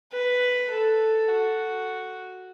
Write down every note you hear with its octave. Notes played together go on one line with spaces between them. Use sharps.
B4
A4
F#4